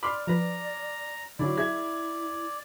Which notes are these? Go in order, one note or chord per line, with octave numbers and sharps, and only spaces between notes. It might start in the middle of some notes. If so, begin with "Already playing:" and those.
D5 B5 C6 D6 F6
F3 B4 A#5
D3 F#3 E4 D5
E4 G#4 E5 G#6